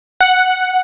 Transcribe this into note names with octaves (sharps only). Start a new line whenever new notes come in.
F#5